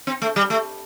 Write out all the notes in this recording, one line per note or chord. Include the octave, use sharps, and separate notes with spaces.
C4
A3
G3
A3